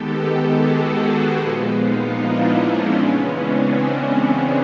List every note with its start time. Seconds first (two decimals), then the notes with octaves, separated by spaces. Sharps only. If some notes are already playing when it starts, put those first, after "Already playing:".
Already playing: D#3 G#3 B3 G4 A4
0.15 G4 A4
0.55 F#4 G#4
1.35 A#2 F3 G#3 B3
1.75 D#4 F4
2.14 D4 E4
2.55 C#4
2.95 C#3 E3 G#3 B3
3.34 C4 D4
4.14 C#4